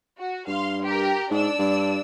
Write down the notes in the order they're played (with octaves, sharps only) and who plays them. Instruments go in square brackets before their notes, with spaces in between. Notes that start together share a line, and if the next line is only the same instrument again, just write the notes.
[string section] F#4
[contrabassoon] G2 [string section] F5 C6
[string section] G4 A#4
[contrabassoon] G#2 [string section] D4 D5 E6
[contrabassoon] G2